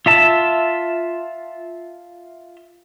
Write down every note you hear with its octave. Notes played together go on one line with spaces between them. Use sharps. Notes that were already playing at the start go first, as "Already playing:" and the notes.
F4 E5 A5